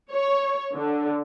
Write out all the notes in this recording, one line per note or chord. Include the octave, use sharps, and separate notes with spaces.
C#5
D3